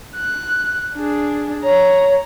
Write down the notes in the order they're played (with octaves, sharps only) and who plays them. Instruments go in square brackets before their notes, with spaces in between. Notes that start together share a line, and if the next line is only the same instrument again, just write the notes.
[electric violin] F#6
D4 G#4
[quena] C#5 [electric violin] A#5